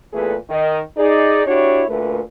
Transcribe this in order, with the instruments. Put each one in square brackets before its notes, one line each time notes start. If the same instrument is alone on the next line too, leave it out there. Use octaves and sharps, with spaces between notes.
[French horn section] E2 A#2 A3 G#4 A4 B4
D#3 D#5
D#4 G#4 D5
D4 E4 F#4 G4 C#5
D2 A#2 A3 A#4 B4